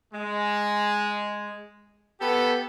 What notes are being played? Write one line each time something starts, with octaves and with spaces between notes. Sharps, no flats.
G#3
B3 G4 A4